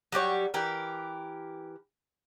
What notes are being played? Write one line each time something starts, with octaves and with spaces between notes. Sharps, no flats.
F#3 G3 G4 C#5
E3 G4 A#4